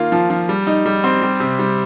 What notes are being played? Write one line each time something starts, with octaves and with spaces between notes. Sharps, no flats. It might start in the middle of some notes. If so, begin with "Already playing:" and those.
Already playing: D#3 A#3 F4
F3
F3
G3
D#4
G3
C4
G3
C3
G3